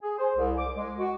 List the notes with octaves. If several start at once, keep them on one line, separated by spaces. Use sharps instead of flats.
G#4
C5
C2
D6
G#3
F#4